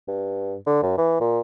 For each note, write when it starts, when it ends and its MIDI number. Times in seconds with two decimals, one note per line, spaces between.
0.08 0.56 43
0.66 0.82 50
0.83 0.93 42
0.98 1.18 52
1.21 1.40 46